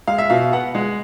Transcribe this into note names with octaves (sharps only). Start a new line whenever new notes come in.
G#3 F5
E5
B2 F5
B3 F#5
G#3